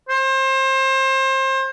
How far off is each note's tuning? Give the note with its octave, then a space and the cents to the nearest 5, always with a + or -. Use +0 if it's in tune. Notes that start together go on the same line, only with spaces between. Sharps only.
C5 +30